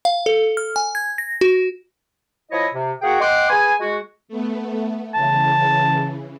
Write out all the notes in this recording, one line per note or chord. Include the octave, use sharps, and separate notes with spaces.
F5
A4
F6
G#5
G#6
A#6
F#4
F3 E4 C#5 D#5
C3
A#3 F#4 G#4 F#5 G5
D#5 F#5 G5 C6 D6
B3 G#4 G#5
G#3 F#4
A3 B3
C#3 E3 A5